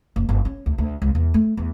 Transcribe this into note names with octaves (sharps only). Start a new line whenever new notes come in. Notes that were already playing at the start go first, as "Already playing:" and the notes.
F#1
G1
C#4
D2
D2
C#2
E2
A3
E2